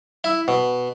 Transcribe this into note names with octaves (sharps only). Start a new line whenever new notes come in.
E4
B2